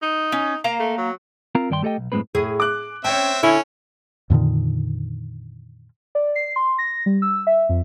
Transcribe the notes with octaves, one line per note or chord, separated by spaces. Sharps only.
D#4
C#4
A#3 F5 A#5
A3
F#3
C4 F4 A#4 F5 A#5
G2 D#3 D5 G5 C6
A3 G4 A4 D5 D#5 G5
B1
F#2 A2 E3 G#3 C4 B4
A2 G#4
D6 F#6
C4 C#4 C#5 E5 G5
D3 C#4 E4 G#5
F2 A#2 D3 D#3
D5
C7
C6
A#6
G3
E6
E5
F2